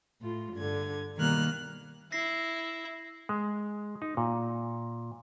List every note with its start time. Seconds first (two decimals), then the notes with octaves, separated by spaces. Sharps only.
0.20 A2 F4
0.54 G2 D3 G#6
1.16 B2 D#3 G3 A#3 F6 F#6
2.12 E4 A#6 C7
3.29 G#3
4.02 D#4
4.17 A#2